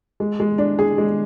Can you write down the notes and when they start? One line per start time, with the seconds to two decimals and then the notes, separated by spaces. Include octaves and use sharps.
0.20 G#3
0.40 G#3
0.58 D4
0.79 G#4
0.98 G#3